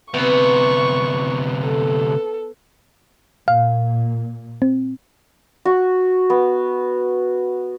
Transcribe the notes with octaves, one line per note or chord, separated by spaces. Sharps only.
D2 C3 B3 C#6
A4
A#2 F5
C4
F#4
B3